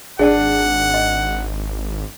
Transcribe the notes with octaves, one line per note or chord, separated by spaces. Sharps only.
G#1 D4 G#4 D5 F#5 A5
D#5